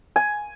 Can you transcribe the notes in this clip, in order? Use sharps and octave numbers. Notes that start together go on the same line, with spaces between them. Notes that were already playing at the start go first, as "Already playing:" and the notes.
G#5